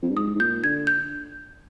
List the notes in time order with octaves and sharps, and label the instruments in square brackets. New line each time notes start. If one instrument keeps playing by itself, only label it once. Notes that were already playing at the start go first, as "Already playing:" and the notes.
[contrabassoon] F2
G2
[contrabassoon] G#2 [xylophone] D#6
[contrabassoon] G#2
[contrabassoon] A#2 [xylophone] G6
[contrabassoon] D3 [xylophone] G#6
[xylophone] G6